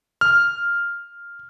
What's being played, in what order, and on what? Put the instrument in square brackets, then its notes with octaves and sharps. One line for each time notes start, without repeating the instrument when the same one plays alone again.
[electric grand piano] F6